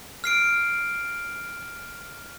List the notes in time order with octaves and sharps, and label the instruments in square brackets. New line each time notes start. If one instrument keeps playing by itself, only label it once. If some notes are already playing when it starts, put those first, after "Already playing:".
[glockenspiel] F6 C7 D7